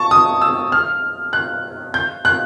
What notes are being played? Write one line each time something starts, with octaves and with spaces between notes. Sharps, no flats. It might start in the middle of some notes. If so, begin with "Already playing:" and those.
Already playing: A5 C#6
D#6
E6
F6
F#6
G6
F#6